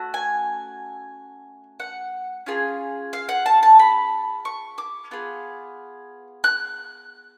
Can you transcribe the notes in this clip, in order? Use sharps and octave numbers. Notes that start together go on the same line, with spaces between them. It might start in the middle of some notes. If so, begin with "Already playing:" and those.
Already playing: A3 C#4 F#4
G#5
F#5
C#4 F4 G#4
F5
F#5
A5
A5
B5
C#6
D6
B3 F4 G#4
F#6